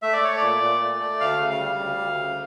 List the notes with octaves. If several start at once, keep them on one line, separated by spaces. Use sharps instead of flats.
A3 E5
D5
A3 C#5
A#2 D5
A#2
A3
A3
D2 F5
C#3
F5
G3
D2
D2
C#3